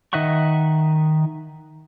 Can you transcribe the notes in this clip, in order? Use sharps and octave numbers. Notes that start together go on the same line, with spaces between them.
D#3 D#5 E5 F#5 C#6